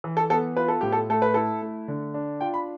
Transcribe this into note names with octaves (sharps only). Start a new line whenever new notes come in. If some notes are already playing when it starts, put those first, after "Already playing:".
E3
A4
B3 A4
F4 B4
A4
A2 G4
A4
A3 A4
B4
E4 A4
A3
D3
D4
F4 G5
B5